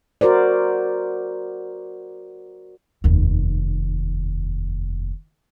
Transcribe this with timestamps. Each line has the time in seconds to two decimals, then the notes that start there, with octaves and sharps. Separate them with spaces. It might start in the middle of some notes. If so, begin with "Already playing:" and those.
0.21 F#4 A#4 C5 D5
3.04 F1 D#2